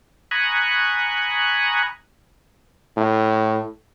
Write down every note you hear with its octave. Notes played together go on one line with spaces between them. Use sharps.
G#5 A#5 B5 C#6 D#6 F#6
A2